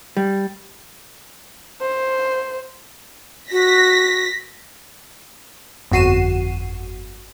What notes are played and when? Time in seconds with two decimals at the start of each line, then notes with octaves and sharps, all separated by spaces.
0.17 G3
1.81 C5
3.52 F#4 A#6 B6
5.91 G1 F2 F#4 C7 D#7 E7